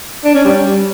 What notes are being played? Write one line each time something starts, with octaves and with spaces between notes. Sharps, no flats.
D4
C#4
G3